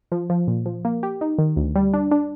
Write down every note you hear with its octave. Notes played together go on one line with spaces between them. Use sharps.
F3
F3
A#2
F3
A#3
G4
D#4
D#3
D2
G3
D4
D4